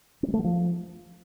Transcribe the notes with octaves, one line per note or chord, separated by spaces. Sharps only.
C4
G#3
A3
F#3
F3